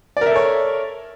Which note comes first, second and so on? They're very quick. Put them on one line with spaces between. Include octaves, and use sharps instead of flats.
D5 A#4 E5 A4 C#5